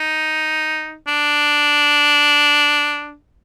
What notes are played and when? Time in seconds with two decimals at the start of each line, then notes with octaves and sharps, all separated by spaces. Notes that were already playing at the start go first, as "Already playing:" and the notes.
Already playing: D#4
1.07 D4